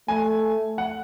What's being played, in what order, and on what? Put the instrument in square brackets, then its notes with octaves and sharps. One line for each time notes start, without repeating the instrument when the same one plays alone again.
[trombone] A3 [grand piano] G#5
[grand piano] F#5